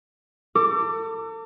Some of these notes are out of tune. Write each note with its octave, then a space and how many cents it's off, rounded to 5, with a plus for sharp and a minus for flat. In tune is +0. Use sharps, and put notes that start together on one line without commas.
A4 +40 D6 +0